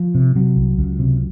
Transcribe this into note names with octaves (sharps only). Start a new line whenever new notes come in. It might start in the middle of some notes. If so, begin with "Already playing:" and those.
Already playing: F3
C3
C3 F#3
C2
C#2
C3